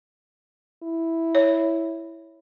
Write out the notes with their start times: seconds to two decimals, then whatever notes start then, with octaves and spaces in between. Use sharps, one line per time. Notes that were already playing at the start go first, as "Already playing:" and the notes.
0.83 E4
1.35 C#5